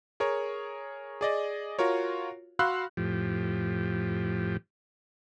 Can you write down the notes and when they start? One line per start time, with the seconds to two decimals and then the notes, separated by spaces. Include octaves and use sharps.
0.20 G#4 A#4 C#5
1.21 G#4 D5 D#5
1.79 F4 F#4 A#4 C#5
2.59 F#4 F5 B5 C6 E6 F#6
2.97 F2 A2 F3 G4